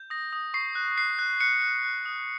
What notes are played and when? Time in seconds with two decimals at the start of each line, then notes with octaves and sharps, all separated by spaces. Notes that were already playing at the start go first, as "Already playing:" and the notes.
Already playing: G6
0.10 D#6 A#6
0.33 D#6
0.54 C#6 C7
0.75 F#6
0.97 F#6 C7
1.19 F#6
1.41 F#6 C#7
1.62 F#6
1.85 F#6
2.05 D#6